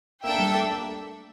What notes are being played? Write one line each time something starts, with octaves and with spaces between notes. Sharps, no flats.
A#3 D4 A4 E5 G5
A3
G3
A3
A#3